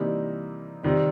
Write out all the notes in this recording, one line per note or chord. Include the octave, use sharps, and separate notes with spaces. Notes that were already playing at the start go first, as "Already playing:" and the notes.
Already playing: C3 E3 G3 A#3 D#4
C3 D#3 G3